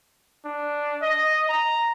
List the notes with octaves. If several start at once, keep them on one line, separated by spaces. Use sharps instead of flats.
D4
D#5
A#5